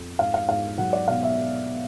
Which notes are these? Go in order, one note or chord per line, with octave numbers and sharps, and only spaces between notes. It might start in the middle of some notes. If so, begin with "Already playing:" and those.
Already playing: F2
G#2 F5
F5
G#2 F5
F#3 F#5
D5
B2 F5
E5